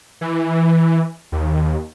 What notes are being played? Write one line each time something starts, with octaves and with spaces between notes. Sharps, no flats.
E3
D#2